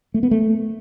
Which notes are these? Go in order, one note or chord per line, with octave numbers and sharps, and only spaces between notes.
A3
B3
A3